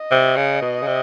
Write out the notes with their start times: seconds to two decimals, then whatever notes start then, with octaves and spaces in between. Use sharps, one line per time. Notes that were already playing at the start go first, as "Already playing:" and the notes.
Already playing: D#5
0.11 C3
0.36 C#3
0.62 B2
0.82 C#3
0.87 C3